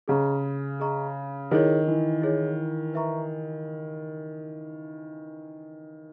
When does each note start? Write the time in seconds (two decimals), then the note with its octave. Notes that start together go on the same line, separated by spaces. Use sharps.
0.08 C#3 G#4 D#5 A#5 C#6
0.80 G#4 D#5 A#5 C#6
1.51 D#3 E4 G#4 C#5
1.87 E3
2.22 E4 G#4 C#5
2.94 B4 E5 A#5 C#6